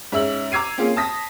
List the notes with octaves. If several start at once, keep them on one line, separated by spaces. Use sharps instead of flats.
G#2 C#4 E5 E6 F#7
A#5 D6 E6 G#6 C7 D#7
A#3 C4 C#4 F4 G#4
A5 D#6 A#6 B6